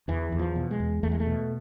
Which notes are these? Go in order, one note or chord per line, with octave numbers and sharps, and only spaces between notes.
E2 E3
E2
F3
B2
G#3
E2
E2 A3
G#3
A3
B2